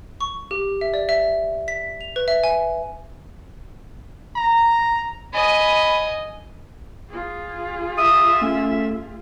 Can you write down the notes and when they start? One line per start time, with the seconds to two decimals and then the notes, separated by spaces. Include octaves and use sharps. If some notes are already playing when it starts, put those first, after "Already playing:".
0.21 C#6
0.51 G4
0.81 E5
0.94 D5
1.09 E5
1.68 B6
2.01 F7
2.16 B4
2.28 E5
2.44 G#5
4.36 A#5
5.33 D#5 G#5 B5
7.09 F4 G#4
7.98 E5 D#6
8.41 A3 C#4